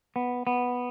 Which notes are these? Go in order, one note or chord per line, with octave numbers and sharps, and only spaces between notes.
B3
B3